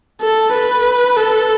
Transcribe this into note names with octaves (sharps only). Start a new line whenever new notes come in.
A4
B4
A4